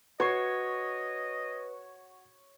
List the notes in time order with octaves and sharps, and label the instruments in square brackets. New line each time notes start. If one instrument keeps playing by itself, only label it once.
[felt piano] F#4 C7 [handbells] B4 C#6 [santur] C#5 [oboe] D#5